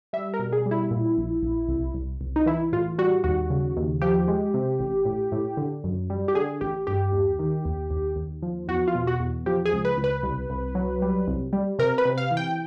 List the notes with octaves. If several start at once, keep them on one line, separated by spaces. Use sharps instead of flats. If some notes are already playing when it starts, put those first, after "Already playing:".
G3 E5
A#4
B2
G#4
G3
E4
A#2
A#1
A#1
C2
C2
C2
D#4
E3 E4
A2 F4
G3 F#4
D#2 F#4
C#3
D#2
F3 G4
G#3
C3
A1
A2
A2
D3
F#2
G3
G4
D3 G#4
A1 G4
G2 G4
D#2
D#3
D#2
D#2
D#2
F3
E2 F#4
F4
B2
F#4
E2
F3 G4
G#4
C#2
B4
C#2
B4
C2
C2
F#3
G3
C2
G3
C3 A#4
B4
C3
F5
E3
G5